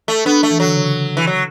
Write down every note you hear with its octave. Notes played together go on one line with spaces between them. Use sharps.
A3
B3 D4
A3
E3
D3 F#3
C#3
E3
F#3